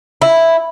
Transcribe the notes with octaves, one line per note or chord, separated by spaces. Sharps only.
E4